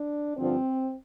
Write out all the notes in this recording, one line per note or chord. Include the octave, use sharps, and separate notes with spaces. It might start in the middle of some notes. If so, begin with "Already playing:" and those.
Already playing: D4
G2 D3 F3 C4